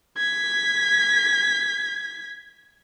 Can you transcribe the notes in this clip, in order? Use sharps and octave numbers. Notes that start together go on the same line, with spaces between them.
G#6 B6